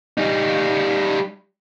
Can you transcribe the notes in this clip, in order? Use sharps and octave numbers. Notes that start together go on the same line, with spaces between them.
G3 D#4